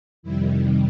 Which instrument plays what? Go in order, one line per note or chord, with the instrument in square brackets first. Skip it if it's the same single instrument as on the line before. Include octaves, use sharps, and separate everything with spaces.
[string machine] F2 C3 D#3 G3 E4